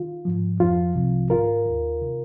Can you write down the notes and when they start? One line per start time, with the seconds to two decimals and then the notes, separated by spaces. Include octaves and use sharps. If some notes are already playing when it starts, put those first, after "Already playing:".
Already playing: D#3 F4
0.25 G#2 F3
0.60 F2 F3 F4
0.95 C2 C3 F3
1.30 G#2 D#3 F4 A#4
1.65 D#2 D#3
2.01 C3 D#3